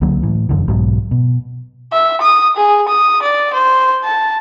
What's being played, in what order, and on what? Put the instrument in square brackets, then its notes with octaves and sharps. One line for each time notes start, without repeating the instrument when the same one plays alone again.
[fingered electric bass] C#2 D3 F#3 A#3
A2 E3
E1 F#2 D3 E3
B1 G#2 B2 F#3
B2
[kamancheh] E5
D#6
G#4
D#6
D5
C5
A5